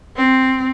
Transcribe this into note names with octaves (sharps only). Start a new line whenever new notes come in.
C4